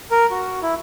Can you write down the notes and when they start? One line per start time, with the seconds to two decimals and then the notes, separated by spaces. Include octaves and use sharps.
0.11 A#4
0.31 F#4
0.63 E4